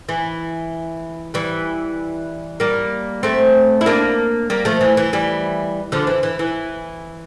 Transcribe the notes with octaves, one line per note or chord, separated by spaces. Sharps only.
E3
E3 G3
G3 A#3
A3 C4
E4
A#3 D4
G3 A#3
F3 A3
E3
E3
E3 G3
D3 F3
E3
E3
E3